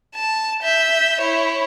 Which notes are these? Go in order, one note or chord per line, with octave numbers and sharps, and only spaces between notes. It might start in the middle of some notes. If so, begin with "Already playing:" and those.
A5
E5 G6
E4 C#5